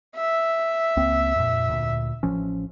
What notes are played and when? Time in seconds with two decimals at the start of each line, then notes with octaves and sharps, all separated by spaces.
0.16 E5
0.97 C#2 A#3 C4
1.36 F2 A#2
1.69 D2 A#2
2.23 A1 F3 C#4